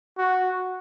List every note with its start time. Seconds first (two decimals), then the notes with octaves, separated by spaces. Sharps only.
0.18 F#4